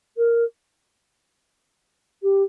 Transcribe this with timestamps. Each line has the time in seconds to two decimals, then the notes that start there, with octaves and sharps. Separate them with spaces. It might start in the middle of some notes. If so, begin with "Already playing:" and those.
0.17 A#4
2.22 G4